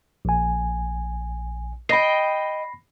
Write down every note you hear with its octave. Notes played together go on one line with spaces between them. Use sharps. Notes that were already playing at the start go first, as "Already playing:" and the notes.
A#1 G#5
D#5 G5 B5 A#6 C7